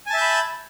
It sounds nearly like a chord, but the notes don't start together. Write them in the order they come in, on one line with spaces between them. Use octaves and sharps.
G#5 A5 E5 G6 B5